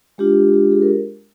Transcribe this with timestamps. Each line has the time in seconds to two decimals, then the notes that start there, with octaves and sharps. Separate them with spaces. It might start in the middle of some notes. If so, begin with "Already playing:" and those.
0.18 G#3 D4 F4 G4
0.54 G4
0.71 G#4
0.82 A#4